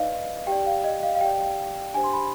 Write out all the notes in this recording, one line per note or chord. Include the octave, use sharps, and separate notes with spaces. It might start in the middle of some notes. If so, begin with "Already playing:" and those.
Already playing: D#4 B4 D5 D#5 F5
G4 D5 G5
F5
D#5
F5
F5
G4 D5 G5
D4 G4 C5 G#5
C6
B5